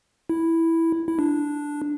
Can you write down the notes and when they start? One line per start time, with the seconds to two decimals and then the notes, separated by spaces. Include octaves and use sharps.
0.30 E4
1.08 E4
1.19 D4